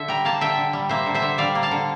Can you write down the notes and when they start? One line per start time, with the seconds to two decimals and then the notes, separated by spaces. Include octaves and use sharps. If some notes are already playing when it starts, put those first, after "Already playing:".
Already playing: D3 E5
0.08 G3 G5 A#5
0.25 A#3 F5 A5
0.41 D3 E5 G5
0.58 D3
0.73 G3
0.89 A#3 C5 E5
1.06 D3
1.14 C5 E5
1.22 D3
1.38 G3 D5 F5
1.55 A#3
1.63 F5 A5
1.71 D3